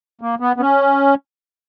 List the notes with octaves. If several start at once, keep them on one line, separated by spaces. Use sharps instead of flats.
A#3
B3
B3
C#4